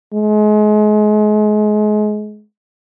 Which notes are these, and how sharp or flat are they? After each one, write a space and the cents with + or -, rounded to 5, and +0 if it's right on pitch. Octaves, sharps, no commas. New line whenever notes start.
G#3 +30